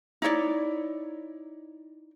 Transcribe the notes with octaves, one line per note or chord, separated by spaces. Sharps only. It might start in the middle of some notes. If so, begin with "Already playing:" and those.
D#4 E4 C#5 D5